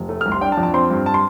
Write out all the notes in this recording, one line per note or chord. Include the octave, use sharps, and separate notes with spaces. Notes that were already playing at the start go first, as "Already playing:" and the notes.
Already playing: F1
A3
F6
C2
C6
D4 G5
A5
F2
A5
C4 C6
G2
A5
C6